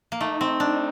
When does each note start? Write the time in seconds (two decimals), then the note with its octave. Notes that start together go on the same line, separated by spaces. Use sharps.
0.12 A#3
0.21 A3 D#4
0.41 C4
0.60 D4